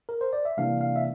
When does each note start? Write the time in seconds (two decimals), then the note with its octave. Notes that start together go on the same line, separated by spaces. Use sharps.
0.09 A#4
0.21 C5
0.33 D5
0.45 E5
0.57 C3 E3 G3 A#3 D4 F5
0.81 F5
0.96 E5